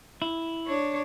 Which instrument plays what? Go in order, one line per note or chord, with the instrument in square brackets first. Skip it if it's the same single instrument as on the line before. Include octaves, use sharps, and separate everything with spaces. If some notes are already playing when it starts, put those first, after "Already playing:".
[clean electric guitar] E4
[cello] D4 C#5